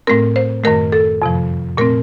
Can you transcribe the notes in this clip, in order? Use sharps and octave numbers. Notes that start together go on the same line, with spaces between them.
A2 A3 C4 A#4
C5
F#2 D#3 A3 A#4
A4
F2 C3 F3
A#2 A3 C4 A#4